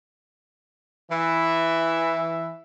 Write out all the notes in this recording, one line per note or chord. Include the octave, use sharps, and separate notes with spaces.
E3 E5